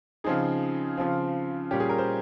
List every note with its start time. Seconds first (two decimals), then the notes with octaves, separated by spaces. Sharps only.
0.24 C#3 F3 C4 D#4 G#4
0.98 C#3 F3 C4 F4
1.71 A#2 G3 C#4 G4
1.80 G#4
1.89 A#4
1.98 C5